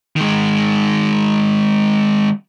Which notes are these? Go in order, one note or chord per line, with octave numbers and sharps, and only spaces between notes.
D#3 G#3